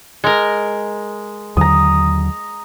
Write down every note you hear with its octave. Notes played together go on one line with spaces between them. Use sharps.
G#3 A#4
D#2 D3 F#3 A#5 D#6